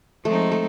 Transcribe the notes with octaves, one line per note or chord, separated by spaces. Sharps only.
F3 G#3 A3 C4 D#4
A3